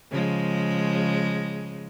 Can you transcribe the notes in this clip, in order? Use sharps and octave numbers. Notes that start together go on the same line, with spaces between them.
C#3 F3 G#3